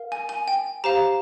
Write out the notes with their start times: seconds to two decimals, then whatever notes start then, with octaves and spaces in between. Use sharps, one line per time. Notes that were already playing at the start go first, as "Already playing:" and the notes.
Already playing: A#4 F5
0.12 G#5
0.29 G#5
0.48 G5
0.84 G4 C5 F5 A#5